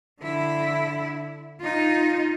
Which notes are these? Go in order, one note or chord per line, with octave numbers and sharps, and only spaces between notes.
D3 E4
D#4 F4